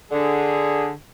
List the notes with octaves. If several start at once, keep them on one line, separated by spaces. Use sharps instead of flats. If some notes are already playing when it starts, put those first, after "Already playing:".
D3 G#4